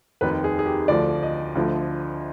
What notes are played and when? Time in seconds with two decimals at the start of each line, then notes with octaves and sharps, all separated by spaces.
0.21 F1 D#2 D#3 B4
0.44 G#4
0.59 G#4
0.66 G4
0.88 D2 D3 F3 D5
1.23 D#5
1.55 D2 D3 F3